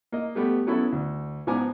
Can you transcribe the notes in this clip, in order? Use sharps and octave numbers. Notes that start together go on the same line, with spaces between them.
A#3 D#5
G3 A3 B3 G4
F#3 B3 C#4 E4 A4
D2
G#2 F3 B3 G#5 A#5 D6